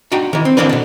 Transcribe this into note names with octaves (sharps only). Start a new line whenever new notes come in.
D4 D#4 F#4 G5
D#3 E3
C4
D#3 E3 A#3 C4 D4 B4
B2 D3